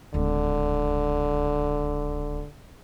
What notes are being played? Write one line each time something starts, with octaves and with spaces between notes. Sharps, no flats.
D1 C#2 D3